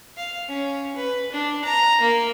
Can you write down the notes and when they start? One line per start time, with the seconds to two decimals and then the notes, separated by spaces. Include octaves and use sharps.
0.17 F5
0.49 C#4
0.96 B4
1.32 D4
1.65 A#5
2.01 A#3